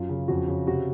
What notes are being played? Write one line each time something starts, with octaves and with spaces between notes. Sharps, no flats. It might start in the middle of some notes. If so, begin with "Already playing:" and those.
Already playing: F#2 F4
C#3
F2 F#4
C#3
C3 F#4